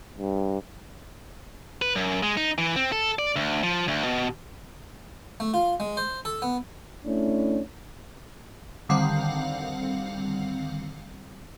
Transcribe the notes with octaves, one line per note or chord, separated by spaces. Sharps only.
G2
B4
F#2
G#3
D#4
E3
C4
A4
D5
D2
F3
D2
B2
A3
F4
G#3
C5
A4
B3
A3 C#4 D4 E4
D3 D#3 G3 C4 F5 F#5